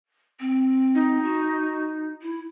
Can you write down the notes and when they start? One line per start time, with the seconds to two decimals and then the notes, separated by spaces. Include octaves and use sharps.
0.40 C4
0.95 D#4
1.22 F#4
2.22 E4